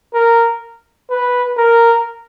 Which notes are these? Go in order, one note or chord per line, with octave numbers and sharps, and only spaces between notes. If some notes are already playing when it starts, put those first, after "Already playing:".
A#4
B4
A#4